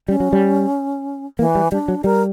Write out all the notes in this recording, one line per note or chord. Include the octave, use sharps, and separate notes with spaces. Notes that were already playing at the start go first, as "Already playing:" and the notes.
G3 C#4
F#3
G3
E3 A#3
G3
G3 D4
F#3
G3 A#4